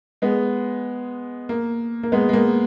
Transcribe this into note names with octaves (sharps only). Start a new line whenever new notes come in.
G#3 B3
A#3
A#3
G#3 B3
G#3
A#3